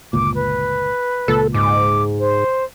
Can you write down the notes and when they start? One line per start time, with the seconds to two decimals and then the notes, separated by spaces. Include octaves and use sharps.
0.13 G1 C#2 A#2 D6
0.35 B4
1.28 C#2 A#2 A4
1.54 G#2 D6
2.19 C5